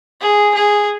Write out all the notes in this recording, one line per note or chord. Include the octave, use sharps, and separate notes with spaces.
G#4
G#4